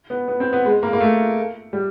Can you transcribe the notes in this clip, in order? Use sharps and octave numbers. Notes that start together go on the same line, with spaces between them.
B3
B3
C4
B3
G#3
A#3
A#3
A3
G3